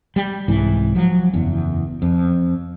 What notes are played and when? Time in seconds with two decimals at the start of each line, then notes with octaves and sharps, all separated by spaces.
0.16 G3
0.48 C2 G#2 E3
0.95 F3 F#3
1.33 F#1 E2
2.02 F2